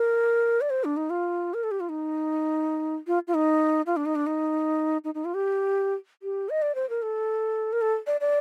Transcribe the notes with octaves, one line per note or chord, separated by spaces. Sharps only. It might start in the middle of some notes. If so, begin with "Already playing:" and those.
Already playing: A#4
D5
C5
D4
D#4
F4
A#4
A4
G4
F4
D#4
F4
F4
D#4
F4
D4
D#4
D4
D#4
D#4
D#4
F4
G4
G4
D#5
D5
C5
A#4
A4
A#4
A4
D5
D5